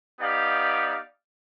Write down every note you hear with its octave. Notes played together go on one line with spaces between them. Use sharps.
B3 D#4 G4 D5 F5